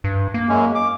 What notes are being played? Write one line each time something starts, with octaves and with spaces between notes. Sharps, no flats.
G2
A#3
F#2 G#3 C#4
D6